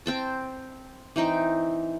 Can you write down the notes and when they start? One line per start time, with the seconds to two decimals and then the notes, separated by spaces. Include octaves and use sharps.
0.06 C4 G5 A5
1.16 E3 C4 D#4 G5